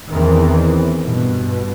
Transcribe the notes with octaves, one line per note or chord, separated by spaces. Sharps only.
E2 D#3 E3 C4
G2 B2